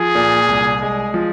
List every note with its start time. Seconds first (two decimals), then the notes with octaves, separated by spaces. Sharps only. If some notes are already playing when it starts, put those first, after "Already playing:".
Already playing: F3 G#4
0.15 A#2
0.48 C2
0.82 G#3
1.14 F3